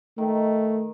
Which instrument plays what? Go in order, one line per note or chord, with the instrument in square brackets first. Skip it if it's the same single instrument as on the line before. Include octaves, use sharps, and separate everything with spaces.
[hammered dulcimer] D#3 [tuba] A3